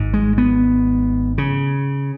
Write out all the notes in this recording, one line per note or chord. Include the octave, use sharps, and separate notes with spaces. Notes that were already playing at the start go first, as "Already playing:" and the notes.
Already playing: G#1 G#2
G#3
B3
C#3